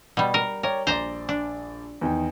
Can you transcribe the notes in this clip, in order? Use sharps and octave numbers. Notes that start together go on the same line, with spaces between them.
B2 G3
A#4
A#4 C#5 D5 G5
A#1 C5 D5 A#5
D4
E2 D#3 G5